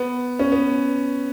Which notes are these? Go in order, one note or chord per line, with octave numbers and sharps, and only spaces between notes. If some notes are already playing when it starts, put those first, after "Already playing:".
Already playing: B3
C#4
B3